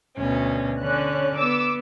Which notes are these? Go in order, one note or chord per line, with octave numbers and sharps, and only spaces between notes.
D2 B2 C#4
D3 C#4 F#6
B3 D6 E6